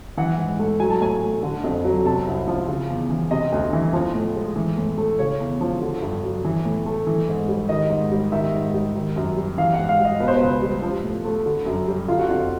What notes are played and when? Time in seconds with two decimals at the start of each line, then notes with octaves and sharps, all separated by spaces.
0.17 E3 F#5
0.38 G#2
0.59 A3
0.80 F#3 G#5
0.90 A5
1.01 A2 G#5
1.22 A3
1.43 D3
1.64 F2
1.84 F#3
2.05 C3 A5
2.27 C2
2.48 F3
2.68 C#3
2.90 E2
3.10 E3
3.31 C3 D#5
3.52 D2
3.73 E3
3.93 F3
4.14 A2
4.36 G#3
4.56 E3
4.78 A2
4.98 A3
5.19 C#3 C#5
5.40 E2
5.61 F3
5.81 D3
6.02 G2
6.23 F#3
6.45 E3
6.65 A2
6.86 A3
7.07 E3
7.28 G#2
7.48 G3
7.69 D#3 D#5
7.90 G#2
8.12 G3
8.32 D#3 E5
8.54 G#2
8.74 G3
8.95 D#3
9.16 F#2
9.37 G3
9.58 E3 F5
9.74 G#2 F#5
9.89 F5
9.99 G3
10.05 D#5
10.20 B2 B4
10.28 C5
10.36 C#2 B4
10.62 G3
10.82 F3
11.04 A2
11.25 A3
11.46 D3
11.66 F#2
11.88 G3
12.08 D3 F4
12.19 F#4
12.29 F2 F4